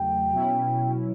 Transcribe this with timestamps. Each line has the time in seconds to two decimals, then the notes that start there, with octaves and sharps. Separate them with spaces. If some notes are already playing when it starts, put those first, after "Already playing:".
Already playing: E2 C#3 F#3 A3 G5
0.33 B2 F#3 C#4 E4